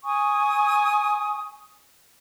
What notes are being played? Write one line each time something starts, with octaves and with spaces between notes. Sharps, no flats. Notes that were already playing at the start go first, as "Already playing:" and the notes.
G#5 C#6 D#6